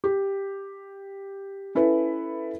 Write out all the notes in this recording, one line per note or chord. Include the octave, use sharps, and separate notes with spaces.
G4
C#4 E4 A4 B4